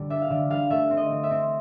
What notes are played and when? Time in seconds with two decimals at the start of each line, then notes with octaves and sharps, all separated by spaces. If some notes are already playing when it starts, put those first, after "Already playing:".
Already playing: D3 G3
0.10 D4 E5
0.22 F5
0.30 D3 E5
0.50 G3 F5
0.70 A3 E5
0.90 C4
0.97 D#5
1.11 C4
1.23 E5
1.30 C4